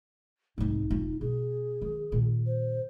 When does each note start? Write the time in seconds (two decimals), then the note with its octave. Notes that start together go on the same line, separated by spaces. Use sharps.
0.58 C2 G#2 D#4
0.90 E1 F4
1.21 B2 G#4
1.82 D#3
2.12 A#2 D#3
2.47 C5